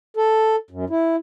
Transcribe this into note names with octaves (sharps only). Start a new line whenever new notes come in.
A4
F#2
E4